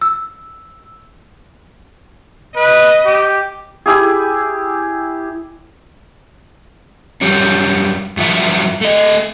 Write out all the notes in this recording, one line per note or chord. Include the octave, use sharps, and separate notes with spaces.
E6
B4 D#5
G4
E4 G4 G#4
F#2 G3 C#4
G2 F3 F#3 E5
A3 D#5